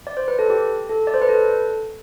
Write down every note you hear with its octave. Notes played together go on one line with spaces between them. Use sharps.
D5
C5
B4
A4
G4
A4
D5
C5
B4
A4